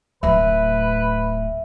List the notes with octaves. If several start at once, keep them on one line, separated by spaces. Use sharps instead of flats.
D1 A2 B4 E5